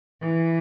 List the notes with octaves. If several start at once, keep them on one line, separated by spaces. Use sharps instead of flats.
E3